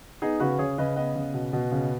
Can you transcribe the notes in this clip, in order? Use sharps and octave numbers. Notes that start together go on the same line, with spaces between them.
B3 D#4 G#4
C#3 F#4 B4
C#3 G#4 C#5
C#3 B4 D#5
B3 B4 D#5
C#3
B2
B2
C#3